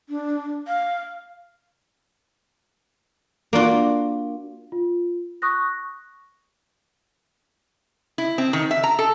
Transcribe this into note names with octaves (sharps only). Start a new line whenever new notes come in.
D4
F5
A#3 D4 F4 F#4
F4
C#6 D#6 F#6 A#6
E4
C4
D#3
E5
A#5
A4